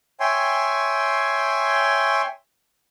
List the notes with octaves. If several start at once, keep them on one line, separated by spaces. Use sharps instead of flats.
C#5 E5 G5 G#5 C6